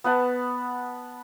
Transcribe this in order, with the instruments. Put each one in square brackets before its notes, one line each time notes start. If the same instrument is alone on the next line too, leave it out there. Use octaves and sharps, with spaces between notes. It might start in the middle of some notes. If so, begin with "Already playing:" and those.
[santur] B3 B4 F#5 A5